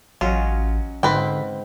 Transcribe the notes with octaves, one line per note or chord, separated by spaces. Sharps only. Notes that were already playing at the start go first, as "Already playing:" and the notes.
A1 F#3 C#4 F4 D#5
G#2 D3 C4 B4 G5